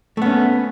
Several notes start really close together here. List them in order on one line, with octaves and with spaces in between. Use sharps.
A3 B3 C#4